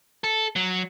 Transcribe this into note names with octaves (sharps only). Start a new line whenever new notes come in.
A4
F#3